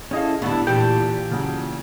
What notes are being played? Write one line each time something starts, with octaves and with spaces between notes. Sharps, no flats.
C#4 E4 G#4 A4 D#5 F5
A2 D3 G3 B3 D4 E4 A5
E2 A#2 E3 G4 G5 A5
C#3 F#3